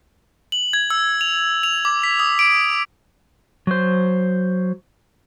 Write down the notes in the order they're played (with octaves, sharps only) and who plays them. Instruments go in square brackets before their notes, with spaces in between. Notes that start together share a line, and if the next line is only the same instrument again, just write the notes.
[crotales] F#7
G#6
E6
F7
F7
D6
B6
D#6
D7
[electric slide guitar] F#3 C5